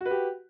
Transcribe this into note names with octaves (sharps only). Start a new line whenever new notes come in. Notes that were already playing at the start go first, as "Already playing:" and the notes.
F#4 G4 B4